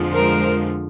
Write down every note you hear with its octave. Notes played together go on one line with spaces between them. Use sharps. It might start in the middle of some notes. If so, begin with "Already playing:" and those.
Already playing: F2 D3 F3 G#3
A#4 C5